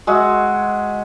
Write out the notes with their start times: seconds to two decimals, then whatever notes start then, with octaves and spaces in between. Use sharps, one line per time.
0.07 G#3 F#4 E5